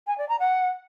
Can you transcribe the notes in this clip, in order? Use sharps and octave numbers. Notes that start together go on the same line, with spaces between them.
G#5
D5
A#5
F#5